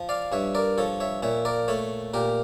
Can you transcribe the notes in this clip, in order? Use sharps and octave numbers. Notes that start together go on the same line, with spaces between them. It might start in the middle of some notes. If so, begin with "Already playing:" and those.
Already playing: F3
D5 F5
G2 C#5 E5
A#4 D5
F3 A4 C#5
C#5 E5
A#2 C#5 E5
A#4 D5
A3 A4 C#5
A#2 G4 A#4